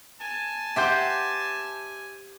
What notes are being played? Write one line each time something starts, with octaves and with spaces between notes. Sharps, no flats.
G#5 A5
G4 C5 E5 F#5 D6 G6